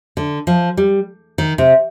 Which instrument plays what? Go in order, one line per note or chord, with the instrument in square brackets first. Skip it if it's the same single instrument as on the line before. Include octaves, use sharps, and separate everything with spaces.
[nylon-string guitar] D3
F3
G3
D#3
C3